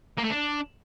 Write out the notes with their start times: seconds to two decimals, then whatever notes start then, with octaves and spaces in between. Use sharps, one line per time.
0.18 A#3
0.24 A3
0.30 D4